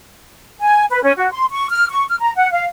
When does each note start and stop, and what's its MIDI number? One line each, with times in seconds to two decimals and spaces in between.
0.62 0.85 80
0.90 1.02 71
1.02 1.11 61
1.16 1.31 66
1.32 1.45 84
1.51 1.67 85
1.69 1.86 89
1.90 2.05 85
2.08 2.16 89
2.20 2.32 82
2.36 2.51 78
2.51 2.65 77